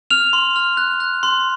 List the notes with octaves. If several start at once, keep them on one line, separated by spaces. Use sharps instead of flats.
F6 F7
C6
F6
F#6
F#6
C6